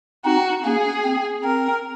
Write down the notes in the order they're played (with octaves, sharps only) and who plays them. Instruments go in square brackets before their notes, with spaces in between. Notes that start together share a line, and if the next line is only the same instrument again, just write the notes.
[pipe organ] C4 D#4 [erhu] F#4
[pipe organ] A#3 C#4 [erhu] G#4
[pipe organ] C4
[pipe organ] C4 [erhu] A#4